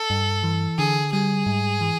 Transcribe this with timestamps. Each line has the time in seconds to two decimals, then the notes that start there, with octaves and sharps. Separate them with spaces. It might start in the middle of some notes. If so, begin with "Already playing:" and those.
Already playing: A4
0.10 G2
0.43 E3
0.78 D3 G#4
1.13 G3 G#4
1.46 G#2
1.81 E3